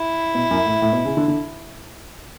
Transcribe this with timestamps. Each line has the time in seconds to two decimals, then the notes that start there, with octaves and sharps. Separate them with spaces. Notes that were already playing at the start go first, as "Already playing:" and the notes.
Already playing: E4
0.35 B2
0.51 F#2
0.66 A2
0.82 A2
0.93 B2
1.05 C#3
1.17 D3
1.28 D3